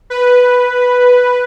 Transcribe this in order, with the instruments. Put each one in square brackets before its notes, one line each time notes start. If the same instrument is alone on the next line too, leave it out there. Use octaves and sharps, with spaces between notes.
[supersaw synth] B4